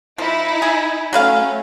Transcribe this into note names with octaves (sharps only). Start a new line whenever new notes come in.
F3 D#4 E4
G#4
F#3 A3 C#4 B4 F5